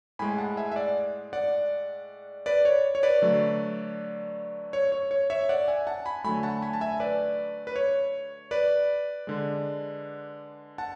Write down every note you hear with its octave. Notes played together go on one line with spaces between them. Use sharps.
A2 G#3 G#5 B5
F#5 A5
E5 G#5
E5
D5 F#5
D5 F#5
B4 D5
C#5
C#5
B4 D5
D3 F#3 A3
C#5
C#5
C#5
C#5 E5
D5 F#5
E5 G#5
F#5 A5
G#5 B5
D3 F#3 A3 G#5 B5
F#5 A5
G#5 B5
A5
E5 G#5
B4 D5
B4
C#5
B4 D5
D3 G#3
F#5 A5